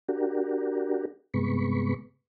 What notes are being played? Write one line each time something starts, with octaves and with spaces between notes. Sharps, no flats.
D4 F#4 G4 A#4
G2 C3 G#3 B3 B5 C#6